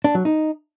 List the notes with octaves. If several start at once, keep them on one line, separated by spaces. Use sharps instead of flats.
D4
F#3
D#4